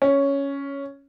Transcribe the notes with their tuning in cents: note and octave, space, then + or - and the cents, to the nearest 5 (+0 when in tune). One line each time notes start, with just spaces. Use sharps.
C#4 +5